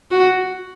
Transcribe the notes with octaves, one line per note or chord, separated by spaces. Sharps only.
F#4